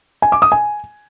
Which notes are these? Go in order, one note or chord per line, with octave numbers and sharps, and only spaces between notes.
G#5
D6
D#6
G#5